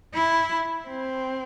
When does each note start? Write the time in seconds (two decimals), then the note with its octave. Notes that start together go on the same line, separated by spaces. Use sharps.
0.14 E4
0.88 C4